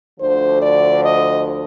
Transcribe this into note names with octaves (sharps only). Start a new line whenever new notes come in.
D2 D3 F3 C5
D5
D#5